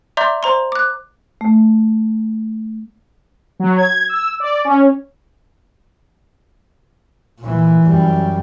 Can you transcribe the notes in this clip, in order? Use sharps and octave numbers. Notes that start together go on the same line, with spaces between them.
D5 E5 A#5 C6 D6 G6
C5 A#5 C6
D6 F#6
A3
F#3
G#6
E6
D5
C#4
A#2 E3
F#2 G3